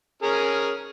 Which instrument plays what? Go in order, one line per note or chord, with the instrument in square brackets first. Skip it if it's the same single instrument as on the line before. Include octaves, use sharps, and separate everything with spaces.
[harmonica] C#4 G#4 A#4